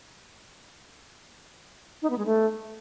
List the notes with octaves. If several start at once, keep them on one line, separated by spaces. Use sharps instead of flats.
D#4
B3
G#3
A3